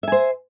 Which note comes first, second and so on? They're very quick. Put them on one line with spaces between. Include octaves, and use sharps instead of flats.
E5 G#5 C5